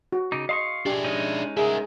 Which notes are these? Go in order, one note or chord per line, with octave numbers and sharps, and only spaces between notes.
F#4
C#3 D#4 D6
D#5 F5 C6 C#6
D4 G4 G#4
G#3 C#4 D#4
E4 G#4 A#4